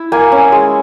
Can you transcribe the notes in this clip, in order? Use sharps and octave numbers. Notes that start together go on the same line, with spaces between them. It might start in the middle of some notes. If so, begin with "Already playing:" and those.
Already playing: E4
A#3 G#5
C#4
G#3